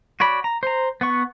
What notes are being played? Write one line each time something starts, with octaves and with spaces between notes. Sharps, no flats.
F#4 C#5 D5 B5
A#5
C5 A#5
B3 F#5 C#6